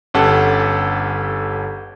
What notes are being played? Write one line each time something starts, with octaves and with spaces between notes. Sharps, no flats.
G1 C#4 G4 A4 F#5 A5